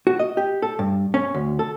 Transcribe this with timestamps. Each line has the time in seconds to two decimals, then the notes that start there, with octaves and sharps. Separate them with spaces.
0.07 F#4
0.19 D#5
0.37 G4
0.62 A4
0.79 G2
1.14 C#4
1.34 D2
1.59 A4